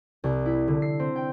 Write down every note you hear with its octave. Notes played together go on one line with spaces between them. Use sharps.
C2
E4
D3
C7
C4
G5